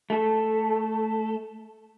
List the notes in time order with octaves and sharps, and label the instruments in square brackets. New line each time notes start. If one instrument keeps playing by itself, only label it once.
[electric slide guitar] A3 A4